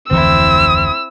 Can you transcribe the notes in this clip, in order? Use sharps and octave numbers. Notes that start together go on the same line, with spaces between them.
F1 D2 E3 C4 E4 E6